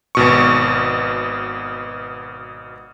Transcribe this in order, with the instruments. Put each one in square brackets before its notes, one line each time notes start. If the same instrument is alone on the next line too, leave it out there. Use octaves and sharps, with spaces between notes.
[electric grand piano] G#1 B2 C#6